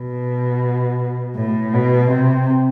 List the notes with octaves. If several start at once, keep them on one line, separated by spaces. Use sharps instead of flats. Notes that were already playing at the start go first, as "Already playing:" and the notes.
Already playing: B2
A2
B2
C3